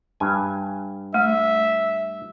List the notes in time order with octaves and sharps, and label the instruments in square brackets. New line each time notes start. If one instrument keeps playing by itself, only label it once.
[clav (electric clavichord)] G2 G#5
[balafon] A3 [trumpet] E5